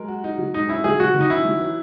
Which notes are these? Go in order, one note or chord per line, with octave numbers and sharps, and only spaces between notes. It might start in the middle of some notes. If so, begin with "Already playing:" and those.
Already playing: F#3 G#3 A#4
F#4
D#4
F#3
G#2 D#4
C#4 E4
F#3 G#4
F#3 F#4
D#3
D#4
C#4 E4
F#3
E3